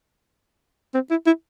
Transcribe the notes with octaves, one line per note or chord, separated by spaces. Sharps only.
C4
E4
E4